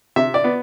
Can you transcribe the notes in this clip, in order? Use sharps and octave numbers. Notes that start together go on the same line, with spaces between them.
C3 E5
D5
B3